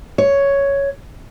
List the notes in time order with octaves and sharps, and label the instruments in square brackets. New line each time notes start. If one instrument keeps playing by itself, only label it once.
[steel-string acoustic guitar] C#5